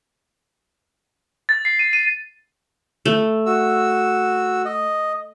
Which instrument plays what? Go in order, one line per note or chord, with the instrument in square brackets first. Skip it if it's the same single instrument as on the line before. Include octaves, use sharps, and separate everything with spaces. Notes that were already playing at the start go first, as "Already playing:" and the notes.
[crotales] A6
C7
D#7
D#7
[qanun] A3
[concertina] F#4 E6
D#5